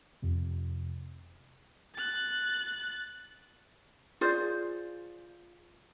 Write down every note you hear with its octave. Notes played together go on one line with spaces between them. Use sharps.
F2 C3
F#6 A6
F4 G#4 C5 D5